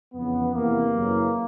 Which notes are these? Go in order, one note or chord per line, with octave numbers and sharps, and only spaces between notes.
F2 C#3 E3 B3
E2 C3 E3 A#3
F#2 C#3 E3